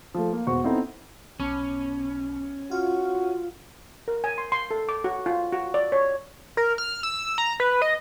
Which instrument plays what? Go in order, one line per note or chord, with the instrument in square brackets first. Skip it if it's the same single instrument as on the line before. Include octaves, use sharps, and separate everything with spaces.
[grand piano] F3 A3
A#3
E1 B3 F#4 C5 C#6
B3 C4 D#4 E4 A4
[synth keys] B1 [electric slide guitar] C#4
[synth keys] F4 [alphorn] F#4
[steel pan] A#4
G#5
C6
C6
A4
D6
F#4
F4
F#4
D5
C#5
[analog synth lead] A#4
F6
E6
A#5
B4
D#5